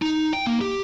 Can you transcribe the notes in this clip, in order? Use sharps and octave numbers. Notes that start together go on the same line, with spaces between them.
D#4
G5
A#3
G4